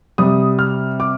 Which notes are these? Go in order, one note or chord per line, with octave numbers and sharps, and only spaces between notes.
C3 G3 D#6
F6
D6